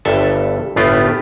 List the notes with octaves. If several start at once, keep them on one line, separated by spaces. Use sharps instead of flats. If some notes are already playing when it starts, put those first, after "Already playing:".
G1 G2 A4 E5 A5
G1 A2 A3 B3 F4 G4